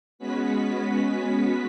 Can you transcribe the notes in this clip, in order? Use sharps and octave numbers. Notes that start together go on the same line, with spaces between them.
G#3 B3 C#4 F#4 B4 B6